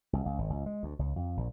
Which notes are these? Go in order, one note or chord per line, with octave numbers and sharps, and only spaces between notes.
C2
C#2
G#1
C#2
G#3
D2
C#2
F2
A#1